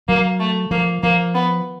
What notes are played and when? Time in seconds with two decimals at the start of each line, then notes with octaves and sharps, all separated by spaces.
0.08 F#3 A#3
0.40 A3
0.71 F3 A#3
1.03 F3 A#3
1.34 B3